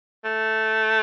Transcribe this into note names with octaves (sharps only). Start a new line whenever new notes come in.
A3